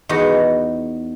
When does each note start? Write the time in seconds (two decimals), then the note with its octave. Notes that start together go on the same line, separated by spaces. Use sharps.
0.09 E2 D#4 F#4